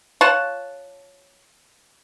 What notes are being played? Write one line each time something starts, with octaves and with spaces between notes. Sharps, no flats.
F4 C#5 F#5 A5